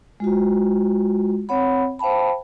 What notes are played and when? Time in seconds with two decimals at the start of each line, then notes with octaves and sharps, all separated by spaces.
0.20 G#3 F4 F#4
1.49 C4 C#5 F#5 B5
1.99 C5 F5 G5 A5 B5